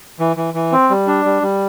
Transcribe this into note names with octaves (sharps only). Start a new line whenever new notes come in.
E3
E3
E3
C4
G3
D4
G3
G3